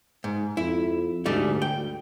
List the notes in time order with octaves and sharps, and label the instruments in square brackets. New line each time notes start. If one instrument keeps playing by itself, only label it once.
[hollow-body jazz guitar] G#2
[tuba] F2 [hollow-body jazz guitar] E4
[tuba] D2 [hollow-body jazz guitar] G#2 G3 A3
[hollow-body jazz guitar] G5